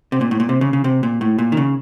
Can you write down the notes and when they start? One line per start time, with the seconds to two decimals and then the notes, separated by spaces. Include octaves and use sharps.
0.12 C3
0.21 A#2
0.31 A2
0.40 A#2
0.49 C3
0.61 C#3
0.73 C#3
0.84 C3
1.03 A#2
1.21 A2
1.38 A#2
1.52 D#3
1.57 C#3